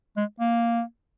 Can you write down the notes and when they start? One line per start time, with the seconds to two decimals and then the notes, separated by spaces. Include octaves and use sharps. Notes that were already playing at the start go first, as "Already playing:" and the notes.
0.17 G#3
0.40 A#3